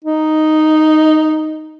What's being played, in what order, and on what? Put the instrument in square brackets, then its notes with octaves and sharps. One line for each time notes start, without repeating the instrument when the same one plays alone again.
[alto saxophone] D#4